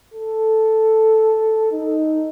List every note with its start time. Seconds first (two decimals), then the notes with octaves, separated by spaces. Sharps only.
0.14 A4
1.72 D#4